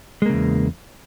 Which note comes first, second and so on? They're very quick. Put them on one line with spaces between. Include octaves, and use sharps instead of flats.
G#3 A#3 C#3 E2